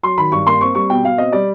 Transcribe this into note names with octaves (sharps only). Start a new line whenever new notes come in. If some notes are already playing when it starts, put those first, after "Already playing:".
F#3 C6
D#3 B5
G2 C#6
A#3 C6
C4 C#6
G3 C#6
B2 G5
B2 F5
C4 D#5
G3 D5